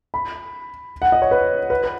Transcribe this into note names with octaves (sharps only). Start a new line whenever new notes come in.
B5
F#5
D#5
C#5
B4
B4
B4